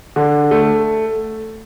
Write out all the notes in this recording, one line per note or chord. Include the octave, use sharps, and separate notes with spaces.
D3
A3